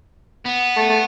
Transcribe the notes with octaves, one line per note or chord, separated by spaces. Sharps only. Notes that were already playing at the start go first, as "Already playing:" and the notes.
B3
A3
A3